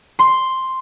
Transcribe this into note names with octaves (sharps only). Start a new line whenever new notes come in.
C6